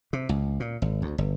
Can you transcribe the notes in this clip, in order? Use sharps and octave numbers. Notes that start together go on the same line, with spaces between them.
C3
C#2
A#2
G#1
D2
G1